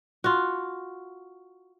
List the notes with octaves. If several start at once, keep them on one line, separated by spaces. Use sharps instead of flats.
F4 F#4